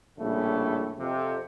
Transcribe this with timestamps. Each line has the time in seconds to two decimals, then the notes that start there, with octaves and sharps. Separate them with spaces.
0.18 A#1 F2 A2 C#3 G3 A3
0.98 F2 C3